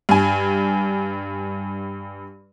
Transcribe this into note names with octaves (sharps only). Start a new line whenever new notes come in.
G2 G#5